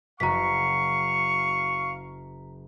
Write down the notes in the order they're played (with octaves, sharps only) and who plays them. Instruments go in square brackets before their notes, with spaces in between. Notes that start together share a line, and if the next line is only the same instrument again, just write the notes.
[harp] F#1 F#4 [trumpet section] F5 C#6 [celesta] A#5 B6